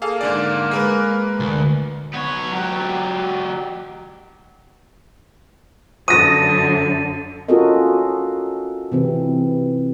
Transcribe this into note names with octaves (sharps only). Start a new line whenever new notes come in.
A#3 G#4 A4 F5
G#2 D3 D5
G#3 A#4 B4
D2
B3 C#5
F#3 G4
F#2 D3 D#6 A#6 D#7
C#4 F4 F#4 A4 A#4 D#5
C3 E3 C4